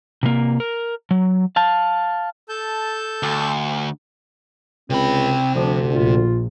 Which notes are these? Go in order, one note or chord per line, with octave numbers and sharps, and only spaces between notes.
C3 A#3
A#4
F#3
F5 A5
A4 A5 G6
D2
C#2 C3 C4 B5
D2 F3 D4
A#1 F4